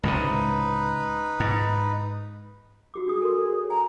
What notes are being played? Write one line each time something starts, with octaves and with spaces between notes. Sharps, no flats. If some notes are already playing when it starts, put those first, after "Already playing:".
C#2 A2 C3 D#4 B4
G#2
F#4 G4 D6
D4 G#4 D#6
A4 A#4 C6
C#5
G#5 A#5